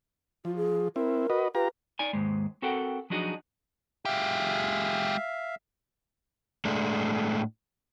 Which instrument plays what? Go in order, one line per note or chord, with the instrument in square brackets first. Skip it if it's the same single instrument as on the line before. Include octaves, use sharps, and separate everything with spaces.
[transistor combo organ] F3 [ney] F4
[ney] G#4
[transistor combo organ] C4 E4 [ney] A#4
[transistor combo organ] F#4 B4 D#5
[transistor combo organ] F4 G4 A#5 [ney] B4
[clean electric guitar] D#4 D5 G#5
D#2 G#2 G#3
C4 F#4 A4 A#4 F#5 G5
F3 F#3 D4 D#4 F#4 G#4
[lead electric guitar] G#3 G4 [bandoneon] E5 F5
[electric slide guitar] A2 G#3 A3 D4